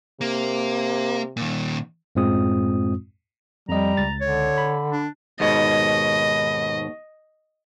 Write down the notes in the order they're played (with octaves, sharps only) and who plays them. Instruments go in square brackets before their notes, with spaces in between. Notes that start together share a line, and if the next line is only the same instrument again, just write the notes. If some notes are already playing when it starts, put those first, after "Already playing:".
[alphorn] C3 [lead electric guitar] A#3
[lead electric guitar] A#2 D#3
[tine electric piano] F#2 A2 G#3 C4 F4 D#6
[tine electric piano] F2 D#5 [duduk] G3 [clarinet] A#5
[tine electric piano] C#2 A6
[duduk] D3 [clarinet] C#5
[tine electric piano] B5
[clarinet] D4
[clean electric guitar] D#2 G#2 B2 [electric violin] D#5